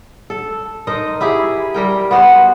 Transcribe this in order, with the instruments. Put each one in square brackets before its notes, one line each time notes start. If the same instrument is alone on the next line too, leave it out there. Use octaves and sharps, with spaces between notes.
[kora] A4
D#4 A#4 C5 D#5
E4 G4 G#4
G3 A#4 G5
B3 F#4 C5